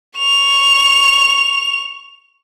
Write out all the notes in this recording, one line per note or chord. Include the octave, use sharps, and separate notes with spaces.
C#6 F7